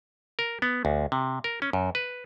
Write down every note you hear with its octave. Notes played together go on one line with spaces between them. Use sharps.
A#4
B3
D2
C3
A#4
C#4
F#2
B4